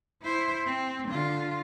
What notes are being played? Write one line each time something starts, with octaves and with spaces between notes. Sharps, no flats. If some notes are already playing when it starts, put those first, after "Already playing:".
E4 C5
C4
D3 F4